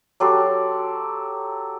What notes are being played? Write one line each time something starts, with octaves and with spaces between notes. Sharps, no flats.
F#3 G4 A4 C6